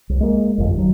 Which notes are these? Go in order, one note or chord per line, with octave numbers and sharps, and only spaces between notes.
C2
G#3 A#3
G1 F2
D#3 F#3